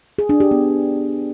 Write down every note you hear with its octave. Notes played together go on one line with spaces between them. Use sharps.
G#4
D4
G4
B3